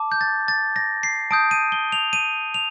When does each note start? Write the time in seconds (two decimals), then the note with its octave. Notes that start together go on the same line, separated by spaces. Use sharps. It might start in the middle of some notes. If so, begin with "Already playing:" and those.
Already playing: A5 D6
0.12 G6
0.21 A6
0.48 A6
0.76 A#6
1.03 C7
1.31 A5 D#6 G6 D7
1.51 D#7
1.72 G7
1.92 F7
2.13 D#7
2.54 F7